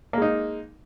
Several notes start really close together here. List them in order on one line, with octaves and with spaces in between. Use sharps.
A#3 G#3 D#4